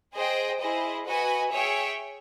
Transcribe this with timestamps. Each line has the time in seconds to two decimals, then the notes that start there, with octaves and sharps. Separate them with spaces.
0.14 G#4 C5 D#5 G5
0.60 E4 G#4 C5 D#5
1.06 F#4 B4 D#5 G#5
1.52 G#4 C#5 E5 G5